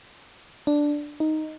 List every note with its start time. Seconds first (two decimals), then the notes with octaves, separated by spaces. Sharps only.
0.67 D4
1.20 D#4